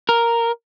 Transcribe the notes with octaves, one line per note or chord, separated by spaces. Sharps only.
A#4